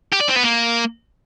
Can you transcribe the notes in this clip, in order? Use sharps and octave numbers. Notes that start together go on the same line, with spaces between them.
G4
D5
C4
B3
A#3